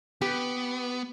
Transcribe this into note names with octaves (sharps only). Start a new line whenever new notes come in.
B3 G4